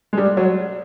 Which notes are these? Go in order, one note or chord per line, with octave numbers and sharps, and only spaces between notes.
G#3
G3
F#3